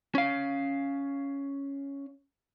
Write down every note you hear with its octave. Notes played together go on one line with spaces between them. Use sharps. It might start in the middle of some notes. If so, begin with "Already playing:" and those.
C#4 F5